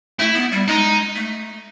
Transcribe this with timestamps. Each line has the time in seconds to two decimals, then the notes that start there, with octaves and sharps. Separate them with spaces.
0.19 A3 E4
0.35 B3
0.52 G3
0.68 G#3 D#4
1.16 A3